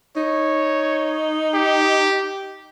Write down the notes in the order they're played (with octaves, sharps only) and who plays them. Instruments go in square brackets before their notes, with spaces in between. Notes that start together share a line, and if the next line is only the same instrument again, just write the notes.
[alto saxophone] D#4 [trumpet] C#5
[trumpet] G4